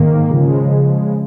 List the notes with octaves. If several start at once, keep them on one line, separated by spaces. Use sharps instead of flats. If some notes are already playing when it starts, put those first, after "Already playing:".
Already playing: G#2 D#3 A#3
C#3 F3 G#3